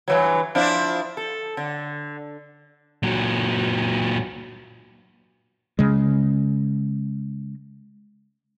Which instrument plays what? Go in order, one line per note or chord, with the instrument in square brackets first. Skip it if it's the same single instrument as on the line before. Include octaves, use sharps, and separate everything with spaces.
[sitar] G2 E3 F#3
F3 D4 E4
A4
D3
[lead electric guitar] A#2 F#3
[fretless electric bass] C#3 G#3